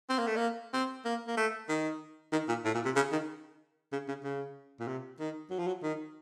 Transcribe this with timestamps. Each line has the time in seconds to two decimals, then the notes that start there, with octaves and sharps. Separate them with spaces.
0.09 C4
0.18 A#3
0.27 A3
0.36 A#3
0.73 C4
1.05 A#3
1.27 A#3
1.37 A3
1.69 D#3
2.32 D#3
2.48 A#2
2.65 A2
2.74 A#2
2.85 C3
2.96 C#3
3.12 D#3
3.92 C#3
4.08 C#3
4.23 C#3
4.80 A#2
4.87 C3
5.20 D#3
5.50 F#3
5.59 F3
5.67 F#3
5.83 D#3